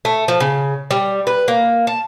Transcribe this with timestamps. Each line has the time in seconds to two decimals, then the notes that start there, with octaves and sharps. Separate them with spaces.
0.05 A3
0.28 F3
0.40 C#3
0.91 G3
1.27 B4
1.48 A#3
1.87 A5